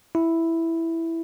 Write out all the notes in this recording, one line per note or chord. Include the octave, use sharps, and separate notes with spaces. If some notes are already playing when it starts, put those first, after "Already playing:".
E4